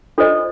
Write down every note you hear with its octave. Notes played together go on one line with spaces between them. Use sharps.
D4 F4 A4 C5 D#5